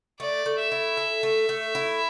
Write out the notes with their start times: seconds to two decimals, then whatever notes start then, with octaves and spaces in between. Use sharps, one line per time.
0.20 A3 D5
0.46 A3
0.59 E5
0.72 E4
0.97 A4
1.23 A3
1.49 A3
1.75 E4